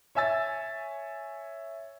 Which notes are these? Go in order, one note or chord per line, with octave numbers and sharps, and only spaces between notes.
C#5 E5 G#5 E6 A6